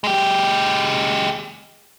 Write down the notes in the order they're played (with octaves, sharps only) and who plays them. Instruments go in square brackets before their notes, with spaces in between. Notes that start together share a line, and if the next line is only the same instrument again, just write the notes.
[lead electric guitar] G#3 G4